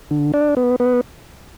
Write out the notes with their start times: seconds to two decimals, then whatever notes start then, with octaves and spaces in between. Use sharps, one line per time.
0.11 D3
0.34 D4
0.57 B3
0.80 B3